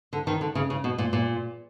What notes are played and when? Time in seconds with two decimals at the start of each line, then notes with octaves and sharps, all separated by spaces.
0.13 D3
0.27 D#3
0.41 D3
0.55 C#3
0.70 C#3
0.84 B2
0.98 A#2
1.13 A#2